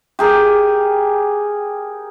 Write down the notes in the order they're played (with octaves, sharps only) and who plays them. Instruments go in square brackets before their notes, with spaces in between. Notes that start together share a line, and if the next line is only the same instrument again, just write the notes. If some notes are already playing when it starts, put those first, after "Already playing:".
[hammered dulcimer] G4 G#4 A#4